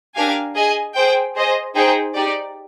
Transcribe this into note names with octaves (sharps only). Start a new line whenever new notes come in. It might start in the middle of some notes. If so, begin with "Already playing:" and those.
D4 G4 A#4 F5 G#5
G#4 D#5 G#5
G#4 C5 G5
G#4 C5 D#5
D#4 G#4 C5 G5
D#4 G4 D5